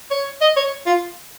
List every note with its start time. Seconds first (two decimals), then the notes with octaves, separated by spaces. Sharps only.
0.11 C#5
0.41 D#5
0.56 C#5
0.86 F4